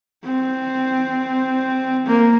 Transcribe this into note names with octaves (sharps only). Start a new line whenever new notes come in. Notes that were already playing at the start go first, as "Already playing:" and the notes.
C4
A#3